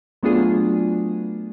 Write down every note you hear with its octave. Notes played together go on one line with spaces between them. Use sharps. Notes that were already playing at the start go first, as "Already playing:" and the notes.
F#3 A3 B3 D4 F4 G#4